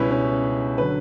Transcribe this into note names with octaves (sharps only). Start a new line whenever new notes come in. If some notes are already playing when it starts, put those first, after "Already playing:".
Already playing: C#2 B2 G3 C#4 E4 B4
C#4
D3 F#3 B4